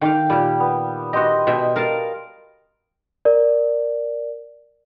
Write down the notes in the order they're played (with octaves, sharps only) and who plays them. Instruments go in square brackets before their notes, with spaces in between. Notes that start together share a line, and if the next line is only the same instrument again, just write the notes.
[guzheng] D#3 F5 [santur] G5 D6
[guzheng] A#2 G4 [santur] G3
[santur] B3
[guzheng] F#4 G4 [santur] D#5 C6
[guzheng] B2 E5 G5
A#4 F5 A5
[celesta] A#4 D5